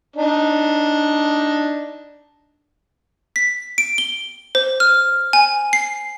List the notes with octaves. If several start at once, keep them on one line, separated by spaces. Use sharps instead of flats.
D4 D#4
B6
D7
G7
C5
F6
G#5
C7